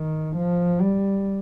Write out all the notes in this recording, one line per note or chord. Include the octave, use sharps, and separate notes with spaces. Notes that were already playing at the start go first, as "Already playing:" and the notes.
Already playing: D#3
F3
G3